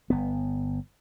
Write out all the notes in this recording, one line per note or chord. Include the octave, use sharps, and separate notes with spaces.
G1 B3